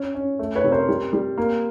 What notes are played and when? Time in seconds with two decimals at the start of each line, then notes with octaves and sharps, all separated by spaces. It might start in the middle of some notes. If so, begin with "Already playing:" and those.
Already playing: C#4
0.15 C#4
0.39 A3
0.55 B4 C#5
0.64 C3
0.72 A#4 C5
0.89 G3
1.13 G3
1.38 A#3